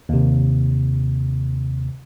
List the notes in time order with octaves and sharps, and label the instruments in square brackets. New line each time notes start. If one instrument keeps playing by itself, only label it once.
[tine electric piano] D#2 C3